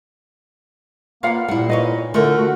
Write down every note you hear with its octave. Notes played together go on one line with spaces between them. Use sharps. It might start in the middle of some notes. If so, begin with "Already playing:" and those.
A#3 F4 B4 D5 F5 F#5
A#2 G3 E4 F#5
D#4 B4 C#5 D#5
D3 A3 E4 F4 A#4
F#4